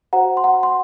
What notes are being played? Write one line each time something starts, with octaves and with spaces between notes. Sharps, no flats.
F#4 C5 F#5 A#5
C6
F#5 A#5
C6